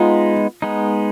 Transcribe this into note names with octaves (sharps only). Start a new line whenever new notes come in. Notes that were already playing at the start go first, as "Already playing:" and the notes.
Already playing: G#3 B3 D#4 F4
G#3 B3 D#4